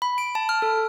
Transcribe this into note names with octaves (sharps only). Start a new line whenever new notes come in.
B5
D7
A5
F6
A4